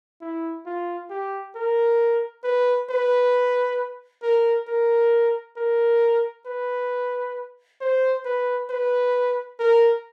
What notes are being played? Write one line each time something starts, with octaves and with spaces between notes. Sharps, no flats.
E4
F4
G4
A#4
B4
B4
A#4
A#4
A#4
B4
C5
B4
B4
A#4